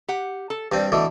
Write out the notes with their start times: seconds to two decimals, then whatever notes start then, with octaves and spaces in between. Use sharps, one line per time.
0.08 G4 F#5
0.50 A4
0.72 G2 G3 C4
0.92 B2 D3 E3 A3